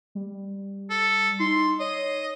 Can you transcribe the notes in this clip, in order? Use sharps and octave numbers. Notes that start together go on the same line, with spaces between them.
G3
A4
D#4 C6
C#5 D#5